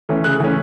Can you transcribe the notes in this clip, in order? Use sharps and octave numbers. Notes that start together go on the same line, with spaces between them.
E3 A3 C#4
C#3 F#6
E3 A3 C#4